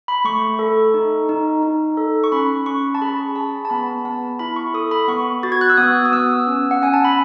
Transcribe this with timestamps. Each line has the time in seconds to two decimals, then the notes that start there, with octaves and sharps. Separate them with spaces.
0.08 B5
0.24 A3 C#6
0.59 A4
0.94 D#4
1.29 D#4
1.63 D#4
1.97 A4
2.24 C#6
2.32 C#4 B5
2.66 C#4 C#6
2.95 A5
3.01 G#4 B5
3.36 G#4 A5
3.65 A5
3.70 B3 B5
4.05 B3 A5
4.39 E4 B5
4.56 C#6
4.74 A4 D#6
4.91 B5
5.08 B3 C#6
5.43 F#4 A6
5.52 G#6
5.61 F#6
5.70 E6
5.77 B3 D#6
6.05 D#6
6.12 B3 E6
6.47 C#4
6.71 F#5
6.81 C#4 G#5
6.94 A5
7.05 B5